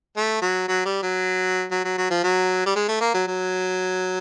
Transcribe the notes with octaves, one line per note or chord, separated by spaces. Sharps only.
A3
F#3
F#3
G3
F#3
F#3
F#3
F#3
F3
F#3
G3
G#3
A3
A#3
F#3
F#3